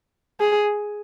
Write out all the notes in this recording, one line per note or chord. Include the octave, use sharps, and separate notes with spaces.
G#4